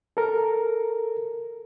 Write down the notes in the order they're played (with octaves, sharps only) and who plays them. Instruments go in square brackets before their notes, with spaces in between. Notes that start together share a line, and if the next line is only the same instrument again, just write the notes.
[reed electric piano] A4 A#4